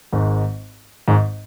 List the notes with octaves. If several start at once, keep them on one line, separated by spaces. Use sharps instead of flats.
G#1 G#2
G#1 G#2